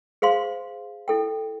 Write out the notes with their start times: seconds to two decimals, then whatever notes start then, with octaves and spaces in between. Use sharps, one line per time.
0.22 G#4 C5 F5 C6
1.08 E4 A4 G5